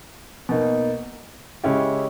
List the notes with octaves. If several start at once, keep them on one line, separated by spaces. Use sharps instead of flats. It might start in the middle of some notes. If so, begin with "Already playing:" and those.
B2 A#3 D#4
C#3 G#3 C#4 E4 G4